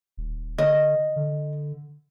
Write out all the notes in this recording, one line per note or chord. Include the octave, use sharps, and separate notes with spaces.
D#1
D3 D#5
D3